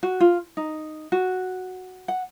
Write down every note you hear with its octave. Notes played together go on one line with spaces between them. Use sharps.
F#4
F4
D#4
F#4
F#5